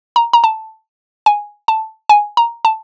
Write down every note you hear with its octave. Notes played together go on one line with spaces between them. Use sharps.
A#5
A#5
A5
G#5
A5
G#5
A#5
A5